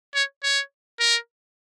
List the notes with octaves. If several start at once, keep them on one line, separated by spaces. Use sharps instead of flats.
C#5
C#5
A#4